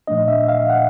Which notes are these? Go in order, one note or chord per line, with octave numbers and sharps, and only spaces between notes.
A#2 F3 A3 D4 D#5
E5
F5
F#5